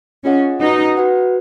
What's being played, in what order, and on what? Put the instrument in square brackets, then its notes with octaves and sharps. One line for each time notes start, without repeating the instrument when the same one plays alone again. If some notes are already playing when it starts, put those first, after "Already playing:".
[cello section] C#4 [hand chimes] F4 G#4 D#5 F#5
[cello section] D#4 [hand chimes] F#4 B4 F#5
[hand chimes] F#4 B4 F#5